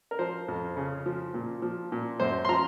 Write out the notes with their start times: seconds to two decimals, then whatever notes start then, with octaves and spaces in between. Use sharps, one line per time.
0.11 A#4
0.19 F3 C5
0.48 F2
0.77 C#3
1.06 F3
1.34 A#2
1.62 F3
1.92 A#2
2.20 F#2 C5
2.45 C6
2.49 F3 A#5